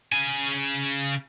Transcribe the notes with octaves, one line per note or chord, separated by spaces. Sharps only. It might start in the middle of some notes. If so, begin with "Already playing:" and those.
C#3 G#5